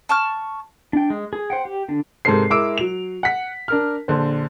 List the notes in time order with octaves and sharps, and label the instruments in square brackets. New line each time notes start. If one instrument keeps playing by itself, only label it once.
[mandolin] A5 C#6 F6
[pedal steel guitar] D4 G5
G#3
G#4
C5 F#5 G5
G4
D3 D4
[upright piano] G#2 C3 A4 A#4 C5 C7
G#3 E4 A#4 D6 E6 D7
F#3 F7
F#5 B6
D4 A#4 F6
A#1 D3 C5